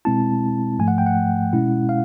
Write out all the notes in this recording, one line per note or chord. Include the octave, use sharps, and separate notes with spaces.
B2 G#3 C4 E4 A5
G#2 F3 A3 G#5
F#5
G5
F#5
B2 G#3 C#4 E4
F5